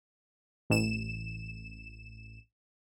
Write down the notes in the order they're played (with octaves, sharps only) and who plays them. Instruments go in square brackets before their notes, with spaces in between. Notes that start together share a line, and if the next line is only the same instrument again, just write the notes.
[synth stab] A1 E7